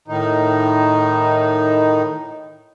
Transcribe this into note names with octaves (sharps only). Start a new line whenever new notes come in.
A2 D#3 D#4